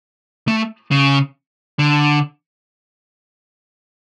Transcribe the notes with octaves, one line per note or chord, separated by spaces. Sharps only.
A3
C#3
D3